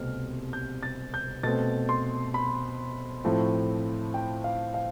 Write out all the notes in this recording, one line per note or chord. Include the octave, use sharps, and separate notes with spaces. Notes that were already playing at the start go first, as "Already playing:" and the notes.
Already playing: C2 B2 A3 C4 F6
G6
A6
G6
B2 A3 C4 A6
C6
B5
A2 F3 A3 C4
G5
F5
F5